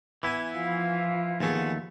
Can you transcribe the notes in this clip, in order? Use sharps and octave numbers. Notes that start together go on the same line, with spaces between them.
E3 B3 E4 G#5
F3 F4
D#2 E3 A3 B3 G#4